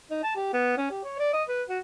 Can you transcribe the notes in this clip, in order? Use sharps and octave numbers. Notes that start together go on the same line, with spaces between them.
D#4
A5
G4
B3
C#4
G4
C#5
D5
D#5
B4
F#4